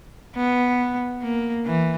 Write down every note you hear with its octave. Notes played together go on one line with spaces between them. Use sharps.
B3
A#3
E3